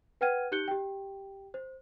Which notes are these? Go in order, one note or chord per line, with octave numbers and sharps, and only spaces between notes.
B4 F#5 G5 F6 G#6 D#7
D#4 G4 F#6 G6 C#7 G7
G4 G5
C5